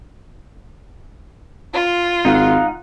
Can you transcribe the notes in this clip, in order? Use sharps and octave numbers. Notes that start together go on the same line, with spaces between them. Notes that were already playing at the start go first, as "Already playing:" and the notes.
F4 C6
G#1 D#4 F5 F#5